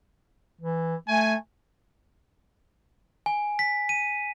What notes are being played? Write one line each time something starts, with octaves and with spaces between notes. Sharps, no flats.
E3
A3 G#5
G#5
B6
D#7